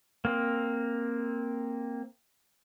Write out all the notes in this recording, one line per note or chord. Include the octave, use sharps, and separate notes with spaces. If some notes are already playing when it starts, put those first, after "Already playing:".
A#3 C4